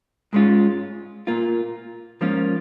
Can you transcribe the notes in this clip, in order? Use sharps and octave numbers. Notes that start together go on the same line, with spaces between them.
G#2 G#3 C#4 F4
A#2 A#3 F4
G#2 F3 A#3 C#4 F4